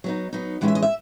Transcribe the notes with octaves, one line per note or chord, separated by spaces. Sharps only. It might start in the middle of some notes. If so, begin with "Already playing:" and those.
F#3 B3 D#4
F#3 B3 D#4
E3 G#3 C#4 E4 F#5
E5
D#5
E5